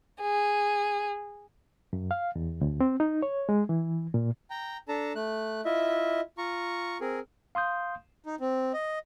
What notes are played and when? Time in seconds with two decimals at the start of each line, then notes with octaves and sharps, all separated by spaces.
0.21 G#4
1.93 F#2
2.11 F5
2.36 E2
2.61 D2
2.81 C4
3.00 D#4
3.22 C#5
3.49 G#3
3.69 E3
4.14 A#2
4.50 G5 A#5
4.88 D4 A4 A5 A#5
5.15 A3 F#6
5.65 E4 F4 D#5 E5
6.38 F4 A#5 C#6
7.01 C4 G#4 A#4
7.55 F5 C6 D#6 G6
8.26 D#4
8.41 C4
8.74 D#5